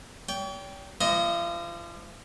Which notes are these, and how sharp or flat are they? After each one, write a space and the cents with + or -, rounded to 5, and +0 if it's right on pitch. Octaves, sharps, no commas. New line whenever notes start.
C#5 +45 G5 +0
F3 -35 D#5 +0 C#6 +25